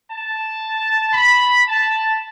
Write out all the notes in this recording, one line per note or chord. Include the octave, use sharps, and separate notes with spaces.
A5
B5
A5